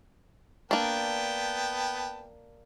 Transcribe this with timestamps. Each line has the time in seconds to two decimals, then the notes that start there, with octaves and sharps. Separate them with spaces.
0.71 A#3 B3 D4 G5 A5